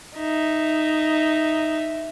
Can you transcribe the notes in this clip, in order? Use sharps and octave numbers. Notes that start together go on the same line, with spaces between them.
D#4 E5